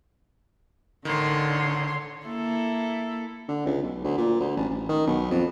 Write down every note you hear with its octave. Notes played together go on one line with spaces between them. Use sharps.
A1 D3 D#3 C#5 C6
A#3 E4 A4
D3
C#2
B1
D2
A#2
D2
A1
A1
D#3
B1
F2